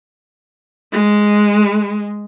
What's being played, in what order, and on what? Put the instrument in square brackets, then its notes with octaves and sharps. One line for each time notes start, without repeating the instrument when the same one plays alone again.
[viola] G#3